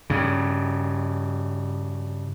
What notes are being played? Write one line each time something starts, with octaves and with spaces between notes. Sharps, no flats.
G2 C#3